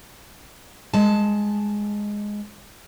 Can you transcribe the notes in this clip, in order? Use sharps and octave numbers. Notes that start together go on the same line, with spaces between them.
G#3 A5